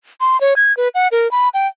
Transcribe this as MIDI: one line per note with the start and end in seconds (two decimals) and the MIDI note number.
0.21 0.40 84
0.41 0.54 73
0.56 0.75 92
0.77 0.88 71
0.95 1.08 78
1.12 1.30 70
1.31 1.49 83
1.54 1.67 79